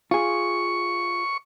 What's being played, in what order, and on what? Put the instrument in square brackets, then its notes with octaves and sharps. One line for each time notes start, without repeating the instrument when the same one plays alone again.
[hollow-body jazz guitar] F4 G#4 [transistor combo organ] C#6